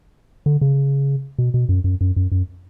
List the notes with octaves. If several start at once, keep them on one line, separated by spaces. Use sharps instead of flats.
D3
C#3
B2
B2
F#2
F#2
F#2
F#2
F#2